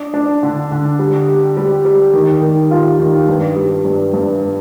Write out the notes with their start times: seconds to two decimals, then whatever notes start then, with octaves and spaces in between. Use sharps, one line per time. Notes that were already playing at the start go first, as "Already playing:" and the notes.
Already playing: D4
0.14 D4
0.43 D3
0.71 D3
0.99 G3
1.29 G4
1.57 G3
1.85 G3
2.13 D#3
2.42 D#3
2.71 F4
2.99 D#3
3.28 G2
3.56 G3
3.85 G2
4.13 G2